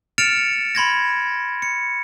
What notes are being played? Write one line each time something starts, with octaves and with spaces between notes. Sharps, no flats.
F6 A6 C#7 D7 E7 F7
B5 C6 G#6 A#6
C#7